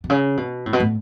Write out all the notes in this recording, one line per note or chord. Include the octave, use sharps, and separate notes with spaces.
B2
C#3
B2
A2
B2
A2